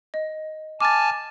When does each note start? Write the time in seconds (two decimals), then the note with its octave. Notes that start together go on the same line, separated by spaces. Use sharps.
0.14 D#5
0.80 G#5 A5 D6 F6 A6